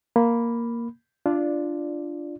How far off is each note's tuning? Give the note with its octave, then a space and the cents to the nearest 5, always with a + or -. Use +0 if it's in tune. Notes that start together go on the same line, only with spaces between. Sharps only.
A#3 +0 B5 +0
D4 +0 F4 -20 D5 +5